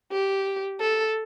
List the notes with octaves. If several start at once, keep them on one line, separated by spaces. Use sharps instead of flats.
G4
A4